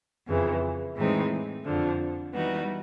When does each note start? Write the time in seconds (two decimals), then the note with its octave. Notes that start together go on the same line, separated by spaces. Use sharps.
0.27 F2 C#3 E3
0.96 A2 E3 G#3 C4 D#4
1.65 F2 D3 F3
2.33 E3 G3 B3 D#4 F#4